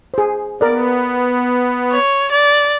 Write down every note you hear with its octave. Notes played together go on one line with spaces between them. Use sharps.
G#4 C5
B3 A#4 D5
C#5
D5